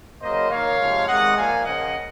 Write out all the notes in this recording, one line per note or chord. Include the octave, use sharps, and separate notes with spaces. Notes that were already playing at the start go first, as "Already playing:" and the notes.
C#3 F#3 A#3 C5 D#5
D#3 A#3 C#5 F5
C3 F3 G#3
C3 D#3 G#3 D#5 F#5
A#2 F3 A#3 F5 G#5
C#3 F3 A#3 D#5 F#5